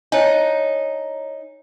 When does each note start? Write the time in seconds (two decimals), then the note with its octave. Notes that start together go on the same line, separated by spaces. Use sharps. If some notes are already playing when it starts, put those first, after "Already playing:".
0.12 D#4 E4 C#5 G#5